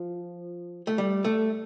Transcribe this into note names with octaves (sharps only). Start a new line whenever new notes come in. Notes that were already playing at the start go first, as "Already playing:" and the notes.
Already playing: F3
A3
G3
A3